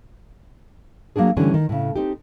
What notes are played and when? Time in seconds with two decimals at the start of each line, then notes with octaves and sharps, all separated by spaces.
1.16 F#3 A#3 C4 D4 G#4
1.37 D3 E3 G3 A3 C#4 D4
1.54 D#3
1.69 A2 C#3
1.96 C4 D#4 G4